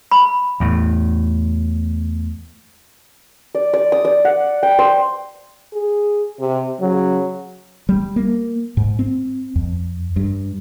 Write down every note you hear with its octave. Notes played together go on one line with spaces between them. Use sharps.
B5
E2 A2
D5
D5
D#6
D5
F#5
G5
C5
G#4
C3
C#3 F#3
G3
A#3
G#2
C4
F2
G2